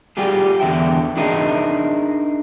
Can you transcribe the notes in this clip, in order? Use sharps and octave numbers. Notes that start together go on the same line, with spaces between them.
G3 F4 G4 G#4
E2 D3 E5 G5
D4 D#4 G#4 A#4 D#5 E5